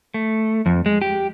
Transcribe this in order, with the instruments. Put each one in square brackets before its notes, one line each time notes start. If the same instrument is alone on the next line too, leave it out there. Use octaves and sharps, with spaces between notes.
[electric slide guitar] A3
F2
G#3
G4